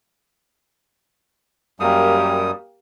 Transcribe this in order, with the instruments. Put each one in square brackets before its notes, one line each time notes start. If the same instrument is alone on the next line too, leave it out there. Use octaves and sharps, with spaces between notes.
[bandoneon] F#2 G3 D#6 [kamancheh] A#3 G4